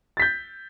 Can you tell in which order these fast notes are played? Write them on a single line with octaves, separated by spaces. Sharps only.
A6 B6 G6